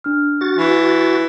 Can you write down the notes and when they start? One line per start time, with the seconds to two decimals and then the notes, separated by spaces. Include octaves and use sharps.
0.04 D4 F6
0.41 F#4 A6
0.58 E3 C#6